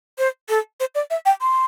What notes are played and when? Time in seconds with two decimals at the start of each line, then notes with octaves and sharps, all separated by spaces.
0.18 C5
0.49 A4
0.80 C5
0.95 D5
1.10 E5
1.26 G5
1.41 C6